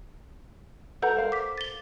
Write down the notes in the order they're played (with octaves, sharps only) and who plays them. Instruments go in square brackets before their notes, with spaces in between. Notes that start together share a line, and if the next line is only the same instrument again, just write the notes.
[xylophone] A4 B4 G6 [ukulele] F#5 A#5
[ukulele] A#4 C5 F5
[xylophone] D6 B6
A6 G7